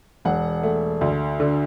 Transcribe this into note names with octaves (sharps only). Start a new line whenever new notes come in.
E1 F#5
A3
D2
D3